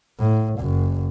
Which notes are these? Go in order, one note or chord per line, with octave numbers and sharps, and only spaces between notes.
A2
F#1 F#2